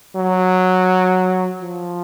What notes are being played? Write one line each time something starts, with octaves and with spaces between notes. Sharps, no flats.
F#3
F3